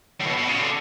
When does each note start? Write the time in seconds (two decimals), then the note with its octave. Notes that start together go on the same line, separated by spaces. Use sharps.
0.20 A2
0.26 B2
0.37 B2
0.48 C#3
0.59 D3